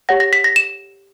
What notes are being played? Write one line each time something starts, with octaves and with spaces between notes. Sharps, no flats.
G4 C#5 F#5 A#6
A#6
B6
A#6
E7